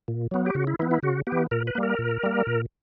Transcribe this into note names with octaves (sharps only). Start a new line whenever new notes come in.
A#2
F#3 B3
G4
C#3 F#4
E4
E3 B3 E4
E4
C#3 F#4
B3 G4
E3
A#2 A#4
B4
G3 A#3
A#4
A#2
G3 A#3
A#2